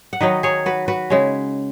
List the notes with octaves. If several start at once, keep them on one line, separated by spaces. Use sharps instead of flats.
F#5
D#3 F#3 D#4 B4 D#5
G#4 C#5
F#4 B4
F#4 B4
C#3 G#3 C#4